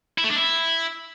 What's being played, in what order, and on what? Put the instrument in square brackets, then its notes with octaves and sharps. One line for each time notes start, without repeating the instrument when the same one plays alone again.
[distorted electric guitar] E4
A3
D4
E4